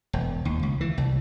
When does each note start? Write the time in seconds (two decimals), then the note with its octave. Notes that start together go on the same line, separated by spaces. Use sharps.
0.13 E1
0.45 D#2
0.63 C#2
0.81 E3
0.98 C2